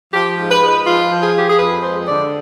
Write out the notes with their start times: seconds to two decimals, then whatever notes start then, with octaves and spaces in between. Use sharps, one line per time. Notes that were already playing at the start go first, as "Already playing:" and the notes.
0.13 F3 G4
0.38 G#2
0.50 B4
0.62 G#3
0.68 B4
0.86 F3 F4
1.11 F3
1.23 G#4
1.35 F3 G4
1.49 G#4
1.59 F2 B4
1.83 G#3 C5
2.08 D3 D5